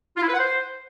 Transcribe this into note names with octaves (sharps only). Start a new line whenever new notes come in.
F4
E4
B4
F#5
C5